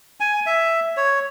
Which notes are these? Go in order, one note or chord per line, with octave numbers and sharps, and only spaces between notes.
G#5
E5
C#5